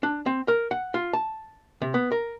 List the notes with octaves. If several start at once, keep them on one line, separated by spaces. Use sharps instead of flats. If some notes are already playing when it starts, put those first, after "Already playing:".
D4
C4
A#4
F#5
F4
A5
C3
B3
A#4